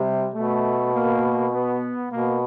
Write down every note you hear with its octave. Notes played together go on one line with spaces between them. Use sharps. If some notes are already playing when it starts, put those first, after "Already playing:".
Already playing: C3 G3
B2 A3
A#3
B3
B2 A#3